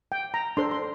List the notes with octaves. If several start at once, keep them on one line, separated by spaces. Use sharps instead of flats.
G5
A#5
D4 A4 C5 C6
C6